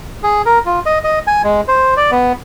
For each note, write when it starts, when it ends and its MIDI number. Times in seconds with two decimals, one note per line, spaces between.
0.23 0.42 68
0.46 0.59 70
0.66 0.80 65
0.86 0.98 75
1.04 1.19 75
1.27 1.42 80
1.44 1.61 56
1.68 1.94 72
1.97 2.11 74
2.11 2.33 59